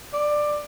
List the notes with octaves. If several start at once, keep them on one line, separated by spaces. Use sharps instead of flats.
D5